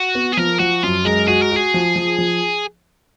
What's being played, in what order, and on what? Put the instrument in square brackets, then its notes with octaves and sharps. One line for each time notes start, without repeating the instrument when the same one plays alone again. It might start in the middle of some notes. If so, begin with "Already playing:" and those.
Already playing: [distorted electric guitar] F#4
[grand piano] B3
[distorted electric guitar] G#4
[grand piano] F3 [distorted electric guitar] A#4
[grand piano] F3 [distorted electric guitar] F#4
[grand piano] F#2 [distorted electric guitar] F4
[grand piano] G#3 [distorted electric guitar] A#4
[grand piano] F#4 [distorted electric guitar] G#4
[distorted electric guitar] A#4
[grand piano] F#4 [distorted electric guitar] G#4
[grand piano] F3
F3
F3